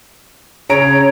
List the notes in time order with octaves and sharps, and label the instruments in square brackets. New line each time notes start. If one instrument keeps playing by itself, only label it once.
[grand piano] C#3 A#5 D7 [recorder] C#5